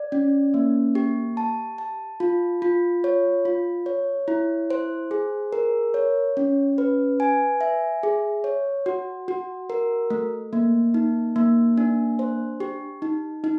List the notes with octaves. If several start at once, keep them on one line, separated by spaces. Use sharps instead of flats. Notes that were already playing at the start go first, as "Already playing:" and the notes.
Already playing: D5
C#4
A#3
G4
A5
A5
F4
F4
C#5
F4
C#5
E4
C5
G#4
A#4
C#5
C#4
B4
G#5
E5
G#4
C#5
F#4
F#4
A#4
A3
A#3
D#4
A#3
D4
C5
G4
D#4
D#4